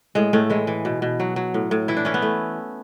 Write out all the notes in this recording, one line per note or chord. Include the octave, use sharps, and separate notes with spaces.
A2 G#3
A2 A3
E3 G#3
E3
B2
B2
F#3
F#3
A2
A2
E3 E4
D4
E3 C#4
B3
A3